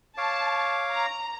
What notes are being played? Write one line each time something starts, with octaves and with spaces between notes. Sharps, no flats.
C#5 F5 A5 D6
A#5